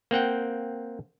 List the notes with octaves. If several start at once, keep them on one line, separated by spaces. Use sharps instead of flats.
A#3 C4 F#5 G5